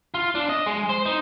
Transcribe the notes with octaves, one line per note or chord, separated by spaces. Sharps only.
F4
D4
D#5
G#3
C5
D#4